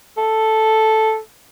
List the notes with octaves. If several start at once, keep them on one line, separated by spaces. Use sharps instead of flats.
A4